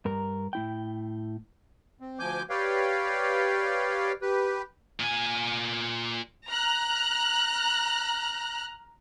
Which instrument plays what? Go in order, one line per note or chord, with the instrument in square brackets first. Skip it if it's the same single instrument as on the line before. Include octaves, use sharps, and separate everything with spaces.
[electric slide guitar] G2 A#4 A#5
A2 E4 G5
[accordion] C4
D2 F3 G#5 D6 G6
G4 B4 C#5 D5 F5 G5
G4 B4
[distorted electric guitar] A#2 G#5
[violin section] A#5 F6 F#6